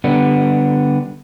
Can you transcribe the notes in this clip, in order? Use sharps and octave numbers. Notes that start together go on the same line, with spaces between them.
D3 G3 B3